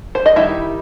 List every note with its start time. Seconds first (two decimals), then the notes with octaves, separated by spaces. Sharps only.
0.15 C5
0.26 D#5
0.36 D#3 G3 D#4 E4 E5